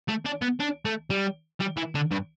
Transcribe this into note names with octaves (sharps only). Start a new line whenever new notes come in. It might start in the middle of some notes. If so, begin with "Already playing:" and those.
A3
D4
B3
D4
A3
G3
G3
E3
D3
G2